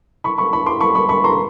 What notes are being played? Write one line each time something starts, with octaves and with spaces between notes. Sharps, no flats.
B5 C#6
B5 C#6
B5 C#6
C6 D6
B5 C#6
B5 C#6
B5 C#6
A#5 C6